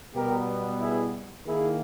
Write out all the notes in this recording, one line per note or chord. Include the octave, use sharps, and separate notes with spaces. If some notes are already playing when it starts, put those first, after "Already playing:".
B2 G3 B3 G4 A#4
E4 G#4
D#3 A#3 E4 G#4